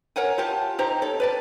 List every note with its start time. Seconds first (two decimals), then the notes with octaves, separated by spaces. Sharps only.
0.16 A#4 C#5 F#5 G#5
0.38 F4 G4 A5
0.78 D#4 G4 C5 A#5
1.02 A4 C#5
1.20 B4 D5 A5